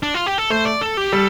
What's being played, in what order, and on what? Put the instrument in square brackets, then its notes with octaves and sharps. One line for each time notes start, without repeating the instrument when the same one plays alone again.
[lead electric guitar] D4
F4
G4
A4
[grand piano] A3 [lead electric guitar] C5
[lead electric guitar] D5
A4
G4
[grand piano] G3 [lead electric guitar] A4